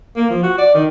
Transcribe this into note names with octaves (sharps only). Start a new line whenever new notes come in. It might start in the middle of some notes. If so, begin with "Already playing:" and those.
A#3
F3
F#4
D5
D#3